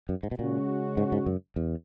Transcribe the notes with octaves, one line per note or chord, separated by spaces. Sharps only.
F#2
G#2
B2
A#2 C#3 G#3 C#4 F#4
G#2
G#2
F#2
E2